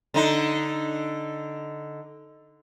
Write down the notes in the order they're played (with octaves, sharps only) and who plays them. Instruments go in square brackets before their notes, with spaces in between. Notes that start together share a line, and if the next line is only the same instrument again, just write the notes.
[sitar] D3 D#4